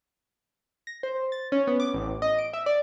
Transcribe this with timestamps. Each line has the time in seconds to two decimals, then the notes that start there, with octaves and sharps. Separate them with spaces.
0.87 A#6
1.03 C5
1.32 A6
1.52 C#4
1.67 B3
1.80 D6
1.94 A1
2.22 D#5
2.39 D7
2.53 E5
2.66 D5